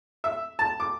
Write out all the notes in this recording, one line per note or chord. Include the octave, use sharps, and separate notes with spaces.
E5
A5
D6